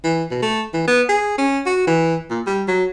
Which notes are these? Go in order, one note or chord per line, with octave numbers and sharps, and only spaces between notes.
E3
B2
A3
E3
B3
G#4
C#4
F#4
E3
A#2
G3
F#3